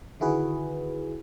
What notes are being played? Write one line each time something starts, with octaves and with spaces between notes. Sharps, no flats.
D3 D#3 E4 F#4 G#4 B4